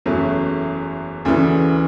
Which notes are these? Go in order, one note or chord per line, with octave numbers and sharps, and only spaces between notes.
F#1 E2 C#3 F#3 A3
D2 C#3 E3